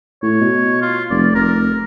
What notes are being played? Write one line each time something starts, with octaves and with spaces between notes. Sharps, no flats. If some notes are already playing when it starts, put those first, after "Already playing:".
A2 C#5
B2
F4
F1 D5
F1 A#4